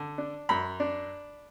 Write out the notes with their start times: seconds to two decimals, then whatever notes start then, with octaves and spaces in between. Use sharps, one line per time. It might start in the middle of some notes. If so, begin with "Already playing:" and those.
Already playing: D3
0.18 D4
0.49 F#2 B5
0.80 D4